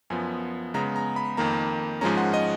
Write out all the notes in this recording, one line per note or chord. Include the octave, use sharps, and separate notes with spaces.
F#2 F3 B3 G#5
C#3 G#3 B3 A#5
A#5
B5
F2 D#3 A#3 A#5
G#2 F3 G#3 C#4 A#5
F#5
D#5